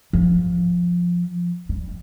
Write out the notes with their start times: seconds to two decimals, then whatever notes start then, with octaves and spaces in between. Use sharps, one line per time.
0.13 F3
1.69 G3